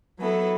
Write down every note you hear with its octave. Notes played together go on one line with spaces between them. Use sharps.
F#3 B3 E4 A4